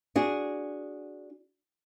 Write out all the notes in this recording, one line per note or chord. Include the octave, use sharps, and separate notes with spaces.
D4 F#4 G#4